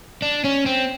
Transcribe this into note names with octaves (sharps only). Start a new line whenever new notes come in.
D4
C#4
C4